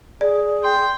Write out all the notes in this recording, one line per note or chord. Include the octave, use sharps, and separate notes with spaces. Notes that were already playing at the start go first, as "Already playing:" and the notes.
G#4 D5
G5 C6